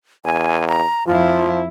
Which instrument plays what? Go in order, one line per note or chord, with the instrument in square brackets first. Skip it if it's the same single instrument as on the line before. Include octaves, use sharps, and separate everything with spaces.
[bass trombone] E2 [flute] G#5
[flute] A#5
[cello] F2 E4 [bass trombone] F3 [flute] F4